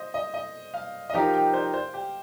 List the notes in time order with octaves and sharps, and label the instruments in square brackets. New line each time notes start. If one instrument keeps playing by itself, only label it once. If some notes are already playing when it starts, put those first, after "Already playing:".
Already playing: [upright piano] C5 D#5
D#5
D#5
F5
D#5
[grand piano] F3 D#4 G4 A#4 [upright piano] F5
[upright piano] G5
C5
C5
G4